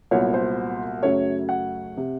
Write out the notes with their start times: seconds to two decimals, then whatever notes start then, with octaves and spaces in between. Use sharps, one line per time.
0.11 C2 A#2 F#3 B3 C#5
0.34 C5
1.03 F#2 C#3 F#3 A3 C#5
1.49 F#5
1.97 C3